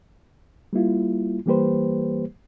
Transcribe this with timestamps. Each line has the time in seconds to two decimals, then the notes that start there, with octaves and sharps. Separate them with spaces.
0.73 G3 A#3 E4 F4
1.46 E3 G3 A#3 G4 B4 C5